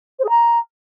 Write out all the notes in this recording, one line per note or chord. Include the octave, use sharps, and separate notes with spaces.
C5
G#4
A#5